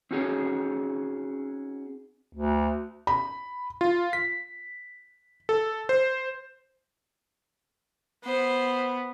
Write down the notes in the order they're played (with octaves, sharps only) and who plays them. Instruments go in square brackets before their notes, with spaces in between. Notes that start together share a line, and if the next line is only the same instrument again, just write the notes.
[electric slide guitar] C4 C#4 D#4 F#4 G#4 C#5
[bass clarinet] D2
[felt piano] B5
[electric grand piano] F4
B6
A4
C5
[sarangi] B3 [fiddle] C5